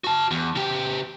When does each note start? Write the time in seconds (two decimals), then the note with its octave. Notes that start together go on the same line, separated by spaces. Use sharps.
0.04 F#4 A5
0.31 E2
0.55 C#3 G4